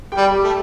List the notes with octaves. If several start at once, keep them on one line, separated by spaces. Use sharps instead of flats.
G4 G5
G3
G4 G5
A3